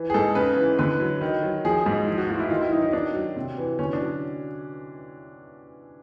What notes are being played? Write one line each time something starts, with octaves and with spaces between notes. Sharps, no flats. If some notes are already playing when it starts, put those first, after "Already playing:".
Already playing: E3
G#4
G#2 A4
C#3 B4
E3
D3 B4
F#3
D#3
F#3
F3 G#4
G#2
F3
F#4
A2 F4
E4
D#3 F4
E4
F#3 D#4
D#4
D#3 D4
F#3
C3
E3
D3 C#4
D4
F#3